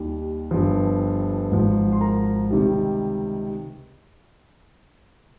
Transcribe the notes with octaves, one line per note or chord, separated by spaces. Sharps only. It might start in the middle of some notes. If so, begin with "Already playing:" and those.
Already playing: D#2 D#3 G3
G1 G2 F3
G#1 G#2 F3
C6
A#4 A#5
C#2 C3 D#3 G3